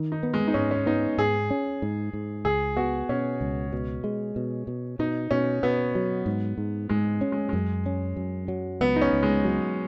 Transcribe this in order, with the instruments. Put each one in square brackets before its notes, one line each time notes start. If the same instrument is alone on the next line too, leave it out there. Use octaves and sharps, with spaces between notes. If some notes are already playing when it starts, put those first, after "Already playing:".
Already playing: [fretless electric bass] D#3
[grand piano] D#4
[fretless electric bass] B3
[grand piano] G#3
D#4
[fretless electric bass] G#2 [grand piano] C#4
[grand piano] C#4
[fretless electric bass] B3 [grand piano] D#4
[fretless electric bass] G#2 [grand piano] G#4
[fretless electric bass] C#4
G#2
G#2
[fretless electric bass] C#2 [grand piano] G#4
[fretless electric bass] B3 [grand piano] F#4
[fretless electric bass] B2 [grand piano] C#4
[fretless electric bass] C#2
B2
G#3
B2
B2
[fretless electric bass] B2 [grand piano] D#4
[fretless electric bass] B2 [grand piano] C#4
[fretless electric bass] B2 [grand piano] B3
[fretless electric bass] F#3
G#2
G#2
[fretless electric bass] G#2 [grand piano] G#3
[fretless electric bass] C#4
[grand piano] G#3
[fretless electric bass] F#2 [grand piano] G#3
[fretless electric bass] C#4
F#2
F#3
[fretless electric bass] C#2 [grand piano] B3
[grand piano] D#4
C#4
[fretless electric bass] C#2
[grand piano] G#3
[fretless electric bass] F#3